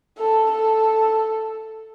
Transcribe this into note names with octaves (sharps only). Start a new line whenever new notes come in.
A4
A4